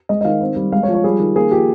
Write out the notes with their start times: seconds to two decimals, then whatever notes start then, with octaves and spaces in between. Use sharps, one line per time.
0.09 G#3 D#5
0.21 D#5
0.25 D#3 F5
0.41 C4
0.56 G3
0.72 G#3 F5
0.83 C#5
0.88 F3
0.94 C#5
1.04 G3 G#4
1.20 D#3
1.36 A#3 G#4
1.51 F3 G4